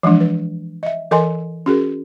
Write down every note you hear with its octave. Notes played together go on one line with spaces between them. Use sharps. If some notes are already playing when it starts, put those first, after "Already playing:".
E3 F3 G#3 D4
B4
D#5 E5
E3 A4 A#4 D#5 G#5 C6
C#4 F#4 G#4 A#4